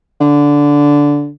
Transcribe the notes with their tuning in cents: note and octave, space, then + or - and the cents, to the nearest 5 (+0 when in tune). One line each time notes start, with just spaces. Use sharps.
D3 -15